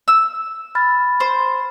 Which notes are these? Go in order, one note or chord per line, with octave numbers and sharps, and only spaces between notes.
E6
B5 F6 A6
C5